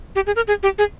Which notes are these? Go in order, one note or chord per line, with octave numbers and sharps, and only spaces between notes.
G4
G#4
A#4
G#4
G4
G#4